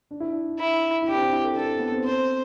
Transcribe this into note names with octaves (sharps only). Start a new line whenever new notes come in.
D4
E4
D4
E4
E4
D4 G4
C4
D4
E4
A4
D4 A4
B3
C4
C4 C5